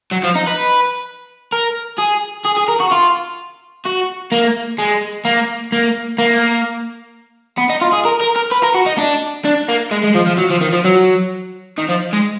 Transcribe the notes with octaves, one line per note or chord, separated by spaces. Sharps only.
F#3
F3
D#4
B4
A#4
G#4
G#4
G#4
A#4
F#4
F4
F#4
A#3
G#3
A#3
A#3
A#3
B3
D#4
F4
G#4
A#4
A#4
A#4
B4
A#4
F#4
D#4
D4
D4
A#3
G#3
G#3
F3
F3
F#3
F3
D#3
F3
F#3
D#3
F3
G#3